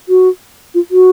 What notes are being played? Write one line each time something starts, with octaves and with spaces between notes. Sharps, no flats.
F#4
F4
F#4